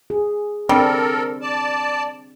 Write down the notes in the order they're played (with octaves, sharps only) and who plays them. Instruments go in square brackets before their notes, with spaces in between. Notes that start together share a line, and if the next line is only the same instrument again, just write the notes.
[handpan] G#4
[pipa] G3 [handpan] C4 D4 [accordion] A4 A#4
[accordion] D5 A5